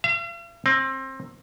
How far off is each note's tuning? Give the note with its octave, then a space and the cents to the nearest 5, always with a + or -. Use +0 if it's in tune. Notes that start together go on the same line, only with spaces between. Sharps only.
F5 -45
C4 +25